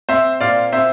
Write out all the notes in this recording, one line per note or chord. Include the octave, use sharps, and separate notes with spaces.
C4 C5 E5
A#2 D5 F5
C4 C5 E5